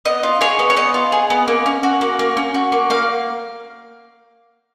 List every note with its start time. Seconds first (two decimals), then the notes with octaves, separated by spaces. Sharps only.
0.05 B3 D#5
0.23 F4
0.41 G#4 C#5
0.59 B3
0.70 C#5
0.76 B3 D#5
0.94 F4
1.12 G#4
1.30 B3
1.48 A#3
1.66 C#4
1.83 F#4
2.01 A#3
2.19 A#3
2.37 C#4
2.54 F#4
2.72 A#3
2.90 A#3 F5